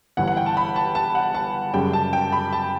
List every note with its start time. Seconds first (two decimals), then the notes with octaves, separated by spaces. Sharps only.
0.17 G1 G2 E3 F#5
0.27 F#5
0.37 G5
0.46 A5
0.57 B5
0.76 A5
0.95 A5
1.15 F#5
1.35 A5
1.74 F#2 C#3 G3 G5
1.93 A5
2.13 G5
2.32 B5
2.53 A5